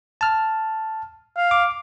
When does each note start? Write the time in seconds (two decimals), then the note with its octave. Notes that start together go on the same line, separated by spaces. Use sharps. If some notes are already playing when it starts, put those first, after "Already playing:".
0.21 A5 F6
1.37 F5
1.51 D6